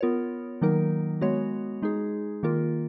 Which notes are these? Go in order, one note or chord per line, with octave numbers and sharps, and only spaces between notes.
B3 F4 A#4 C#5
D#3 F#3 A#3 D#4 A#4
G#3 B3 F#4 C#5
G#3 D#4 G#4
D#3 A#3 F4 A#4